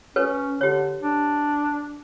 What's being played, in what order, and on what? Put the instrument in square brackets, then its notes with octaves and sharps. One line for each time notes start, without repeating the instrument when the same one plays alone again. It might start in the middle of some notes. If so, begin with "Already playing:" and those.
[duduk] C#4 [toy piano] A4 B4 C#5
[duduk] D3 [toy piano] G4 C#5
[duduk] D4